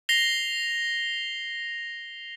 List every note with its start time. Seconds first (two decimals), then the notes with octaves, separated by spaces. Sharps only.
0.09 A#6 C7 F7 G7